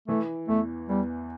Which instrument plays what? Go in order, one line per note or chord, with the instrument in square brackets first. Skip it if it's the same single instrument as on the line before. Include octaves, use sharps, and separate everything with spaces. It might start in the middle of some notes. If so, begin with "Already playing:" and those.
[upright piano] E3 [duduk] A3
[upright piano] E2 [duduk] A3
[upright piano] E2 [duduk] G3